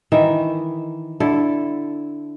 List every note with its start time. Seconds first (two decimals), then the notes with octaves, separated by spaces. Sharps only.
0.12 D#3 E3 E5
1.20 D3 E4 A4